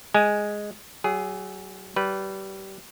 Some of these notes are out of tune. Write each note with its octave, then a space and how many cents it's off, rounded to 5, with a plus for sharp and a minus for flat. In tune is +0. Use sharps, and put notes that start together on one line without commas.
G#3 +0 G#5 +0
F#3 +35 G#4 +0
G3 -20 B4 -10